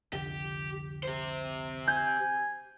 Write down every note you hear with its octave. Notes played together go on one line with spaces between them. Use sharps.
C2 F2 D3 G4
G4 C5
G#5 G6